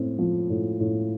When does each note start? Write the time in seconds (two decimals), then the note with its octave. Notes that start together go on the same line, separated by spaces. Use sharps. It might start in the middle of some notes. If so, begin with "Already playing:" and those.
Already playing: A2 C4
0.19 F3
0.50 A2
0.80 A2